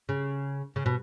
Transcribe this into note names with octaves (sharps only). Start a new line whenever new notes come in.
C#3
C#3
B2